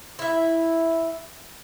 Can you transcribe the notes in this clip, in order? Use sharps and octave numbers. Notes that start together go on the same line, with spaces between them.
E4 E5